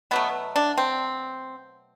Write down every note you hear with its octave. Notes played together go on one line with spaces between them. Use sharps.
B2 F#3 A3 B3
D4
C4